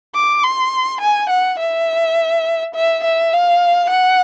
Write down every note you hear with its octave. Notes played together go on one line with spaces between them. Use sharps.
D6
C6
G#5
F#5
E5
E5
E5
F5
F#5